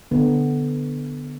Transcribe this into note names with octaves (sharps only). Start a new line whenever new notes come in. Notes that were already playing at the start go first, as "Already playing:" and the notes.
D3 B3